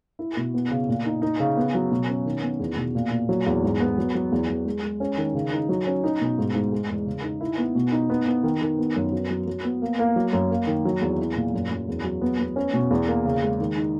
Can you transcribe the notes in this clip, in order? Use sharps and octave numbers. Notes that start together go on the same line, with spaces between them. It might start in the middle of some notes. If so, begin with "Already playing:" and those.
E4
B2
B3
C#3
A#2
D#4
D#4
C#3
B3
F#3
B2
C#4
D#3
B3
E2
B2
A#2
A#2
F#3
E2
G#2
B3
F#3
F#3
E2
E2
G#3
G#3
C#4
D#3
C#3
D#4
F#3
C#4
D#4
B2
G#2
G#2
G#3
E2
C#3
D#4
E4
B3
B2
D#4
B3
B3
D#3
D#3
B3
F#2
F#3
F#3
F#3
B3
A#3
A#3
F#3
F#2
A#3
D#3
F#3
E2
E4
A#2
F#2
F#2
E2
F#3
B3
B3
C#4
B2
E2
A#3
C#3
G#3
D#3
D#4